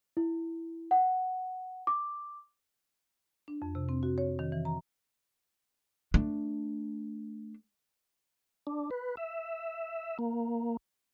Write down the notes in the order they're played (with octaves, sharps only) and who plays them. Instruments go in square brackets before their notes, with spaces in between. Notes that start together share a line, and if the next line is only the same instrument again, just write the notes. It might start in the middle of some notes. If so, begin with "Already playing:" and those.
[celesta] E4
F#5
D6
[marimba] D4
F2
C3
C4
F#4
C#5
D#3
E3
A#5
[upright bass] A3 D4
[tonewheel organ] D4
B4
E5
A#3